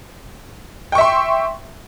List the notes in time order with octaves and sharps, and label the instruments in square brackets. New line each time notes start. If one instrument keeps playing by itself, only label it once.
[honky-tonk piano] G5
C#6
E5
C6